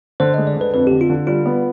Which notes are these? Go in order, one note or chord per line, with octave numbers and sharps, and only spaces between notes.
D3 C5
G#3 D#5
D5
D3 B4
F2 B4
D3 G4
F4
D3
G3 F4
B3